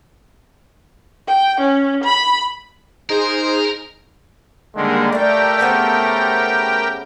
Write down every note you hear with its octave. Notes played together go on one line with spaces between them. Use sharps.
G5
C#4
B5
D#4 G#4 A#4 C5
D3 D#3 G3 G#3 A#3
A3 D4 G4 A#4 F5 G5
C#3 B3 C4